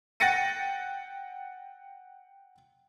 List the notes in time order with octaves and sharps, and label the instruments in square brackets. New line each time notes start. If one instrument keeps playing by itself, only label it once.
[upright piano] F#5 G5 A6 A#6 C#7 D#7